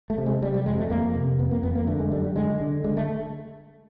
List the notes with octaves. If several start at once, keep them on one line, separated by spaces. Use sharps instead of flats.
A3
C3
G#3
C3 G3
G3
F2 G#3
A3
F2 A#3
C3
F2 B3
A#3
F2 B3
A#3
D3 A3
G#3
F#2 G3
G3
D3 G#3
D3
D3 G#3
A3